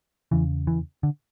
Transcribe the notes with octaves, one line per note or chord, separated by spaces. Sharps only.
E2 C#3 E3
E3
D3